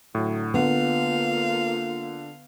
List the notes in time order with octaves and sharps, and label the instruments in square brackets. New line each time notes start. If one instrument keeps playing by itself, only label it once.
[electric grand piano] A2 [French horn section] D3 F#3
[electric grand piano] D3 [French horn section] A#3 F4 [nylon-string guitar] B3 [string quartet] F5